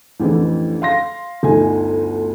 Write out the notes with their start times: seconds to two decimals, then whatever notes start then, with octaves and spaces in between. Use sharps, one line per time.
0.20 A1 F2 D3 E3
0.82 F5 C6 A#6
1.43 G1 D2 D#4 G#5